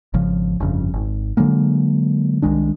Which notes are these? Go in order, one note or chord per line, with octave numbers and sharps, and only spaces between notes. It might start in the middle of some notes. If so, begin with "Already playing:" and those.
G#1 C#3 F3
G1 F2 C#3
G#1
D3 F#3 G#3 A#3
C2 D#3 G#3 D4